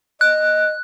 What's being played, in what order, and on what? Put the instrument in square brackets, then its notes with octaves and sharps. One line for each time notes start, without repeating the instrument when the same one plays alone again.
[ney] D#5 [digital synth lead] F#6